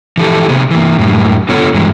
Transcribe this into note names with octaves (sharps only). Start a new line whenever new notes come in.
E3 F3 G4 A4
C3 B3 G#4
E3 A#3
F#2 A2 G3
D3 B3 F4 A4 C#5
G2 E3 G#3